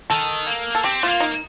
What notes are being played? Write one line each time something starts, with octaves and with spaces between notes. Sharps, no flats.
D#3 A4
A#3
A4
C4 G4
A3 F4
A#3
D#4